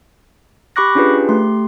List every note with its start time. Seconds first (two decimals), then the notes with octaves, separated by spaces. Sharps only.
0.76 G4 B5 C#6 D6 F#6 A#6
0.95 C#4 D4 F4 G4 G#4 B4
1.29 A3 G4 C6